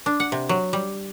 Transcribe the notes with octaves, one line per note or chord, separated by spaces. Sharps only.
D4
F#5
C3
F#3
G3